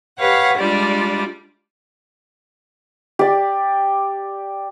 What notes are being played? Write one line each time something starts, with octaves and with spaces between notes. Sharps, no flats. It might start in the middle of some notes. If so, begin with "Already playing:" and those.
G4 B4 C#5 F5 F#5
G3 G#3 D4 F4 D5
G4 D5